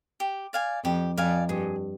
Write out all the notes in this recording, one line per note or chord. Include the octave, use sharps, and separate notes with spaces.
G4
D5 F5 G#5
F2 G4
F2 D5 F5 G#5
G2 G#4